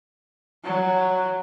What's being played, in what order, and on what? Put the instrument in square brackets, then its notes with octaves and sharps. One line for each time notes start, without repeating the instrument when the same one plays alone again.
[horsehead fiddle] F#3